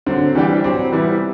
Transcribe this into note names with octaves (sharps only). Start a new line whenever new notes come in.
D3 F#3 C4
E3 G3 D4 G4
F#3 C4 G4
C3 E3 G3 B3 E4